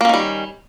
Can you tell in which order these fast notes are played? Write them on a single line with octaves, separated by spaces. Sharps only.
A#3 C#4 D#3 G3